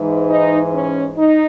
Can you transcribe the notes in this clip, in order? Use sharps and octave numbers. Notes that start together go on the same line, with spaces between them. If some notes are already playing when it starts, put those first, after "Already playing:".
Already playing: G#2 E3
D#4
C#4
D#4